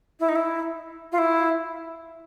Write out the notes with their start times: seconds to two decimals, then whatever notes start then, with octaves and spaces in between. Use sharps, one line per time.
0.19 E4
0.28 D#4
0.35 E4
1.12 F4
1.18 E4